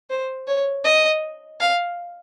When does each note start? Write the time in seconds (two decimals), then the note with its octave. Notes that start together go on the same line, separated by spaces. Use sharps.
0.10 C5
0.48 C#5
0.85 D#5
1.60 F5